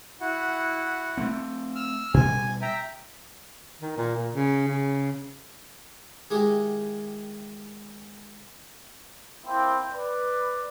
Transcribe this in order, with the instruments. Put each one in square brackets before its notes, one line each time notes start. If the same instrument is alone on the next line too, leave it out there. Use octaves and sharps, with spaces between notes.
[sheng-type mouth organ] E4 F#4 F#5
[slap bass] A3 A#3 C4
[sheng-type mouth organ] E6 F6
[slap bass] B2 G3 [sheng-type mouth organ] G#5
[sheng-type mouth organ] E5 G5 A#5
[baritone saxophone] D#3
A#2
A#2
C#3
C#3
[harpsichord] D#3 G#3 D#4 E4 G4 G#4
[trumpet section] A#3 C4 E4 G5
B4 D5